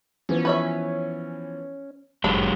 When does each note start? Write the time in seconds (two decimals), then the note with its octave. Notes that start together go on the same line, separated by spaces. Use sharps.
0.29 E3 F3 B3 C#4
0.45 B4 C#5 E5
2.24 G1 F#2 F#3 G#3 A5 B5